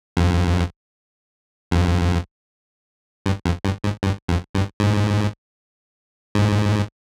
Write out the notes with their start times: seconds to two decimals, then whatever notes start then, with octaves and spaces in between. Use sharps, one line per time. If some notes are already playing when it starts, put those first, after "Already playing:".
0.17 F2
1.71 F2
3.26 G2
3.45 F2
3.65 G2
3.84 G#2
4.03 G2
4.28 F2
4.55 G2
4.80 G#2
6.35 G#2